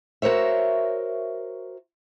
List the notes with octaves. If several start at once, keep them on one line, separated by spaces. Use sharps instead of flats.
F#4 A#4 C5 C#5 E5